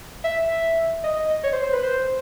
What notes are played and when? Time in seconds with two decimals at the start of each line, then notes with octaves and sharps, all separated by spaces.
0.24 E5
1.04 D#5
1.44 C#5
1.53 C5
1.63 C5
1.73 B4
1.83 C5